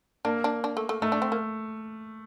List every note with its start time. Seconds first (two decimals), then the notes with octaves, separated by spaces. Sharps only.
0.25 A#3 D4
0.44 D4
0.64 D4
0.77 A3
0.89 A3
1.02 A3 D#4
1.12 D4
1.22 C4
1.32 A#3